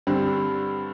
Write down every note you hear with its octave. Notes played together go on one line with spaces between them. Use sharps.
G2 D3 G3 C4